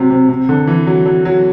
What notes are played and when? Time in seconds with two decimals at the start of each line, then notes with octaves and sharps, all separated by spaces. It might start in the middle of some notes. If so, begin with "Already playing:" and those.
Already playing: C3 F#3
0.10 C3
0.29 C3
0.49 D3
0.67 E3
0.87 F#3
1.06 F#3
1.25 F#3